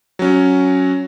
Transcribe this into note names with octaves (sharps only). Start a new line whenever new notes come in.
F#3 C#4